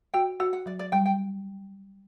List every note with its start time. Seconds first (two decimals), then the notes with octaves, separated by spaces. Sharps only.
0.14 F#4 G5
0.40 F#4 F#5
0.53 F#5
0.66 F#3 D5
0.79 D5
0.92 G3 G5
1.06 G5